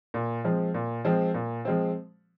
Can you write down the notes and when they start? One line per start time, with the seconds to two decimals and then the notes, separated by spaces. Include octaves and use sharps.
0.14 A#2
0.44 F3 G#3 C4
0.74 A#2
1.05 F3 G#3 C4
1.34 A#2
1.65 F3 G#3 C4